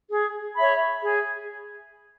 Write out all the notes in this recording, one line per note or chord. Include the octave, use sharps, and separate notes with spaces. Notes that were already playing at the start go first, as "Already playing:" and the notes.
G#4
C#5 E5 B5
G#4